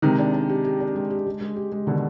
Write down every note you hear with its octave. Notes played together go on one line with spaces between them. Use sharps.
C3 D#3 G#3
D4
D4
G4
G4
D4
G#3
G4
G#3
G#3
G4
G#3
B2 D3 D#3